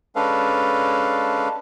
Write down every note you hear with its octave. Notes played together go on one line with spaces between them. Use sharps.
G#3 C#4 D4 A4 B4 F5